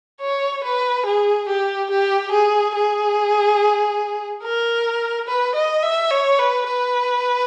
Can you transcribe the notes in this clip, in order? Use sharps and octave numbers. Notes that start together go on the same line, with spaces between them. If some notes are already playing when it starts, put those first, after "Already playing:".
C#5
B4
G#4
G4
G4
G#4
G#4
A#4
B4
D#5
E5
C#5
B4
B4